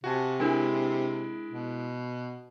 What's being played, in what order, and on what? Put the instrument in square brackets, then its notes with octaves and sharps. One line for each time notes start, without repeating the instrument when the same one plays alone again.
[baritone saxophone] C3 [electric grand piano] F#4 G#5 A5
[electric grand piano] G#3 E4 [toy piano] D4 A#4 G#5
[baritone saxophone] B2